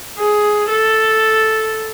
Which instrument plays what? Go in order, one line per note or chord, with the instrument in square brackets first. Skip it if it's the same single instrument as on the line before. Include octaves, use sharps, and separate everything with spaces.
[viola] G#4
A4